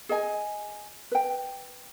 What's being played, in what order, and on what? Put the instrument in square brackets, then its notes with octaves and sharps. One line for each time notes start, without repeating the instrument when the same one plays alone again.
[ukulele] G#4 D#5 G#5
B4 G5